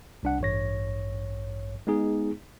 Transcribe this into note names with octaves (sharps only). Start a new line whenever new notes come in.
C2 D4 F#5
A1 G2 C#5 A#6
G#3 B3 D#4 G#4